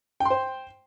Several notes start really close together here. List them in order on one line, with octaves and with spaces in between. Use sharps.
G5 C6 C5